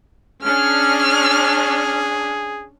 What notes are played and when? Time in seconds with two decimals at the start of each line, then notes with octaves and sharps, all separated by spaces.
0.43 C#4 D4 G#4 F6